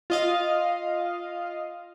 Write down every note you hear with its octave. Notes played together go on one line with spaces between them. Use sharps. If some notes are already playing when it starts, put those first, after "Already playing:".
F4 D#5 F5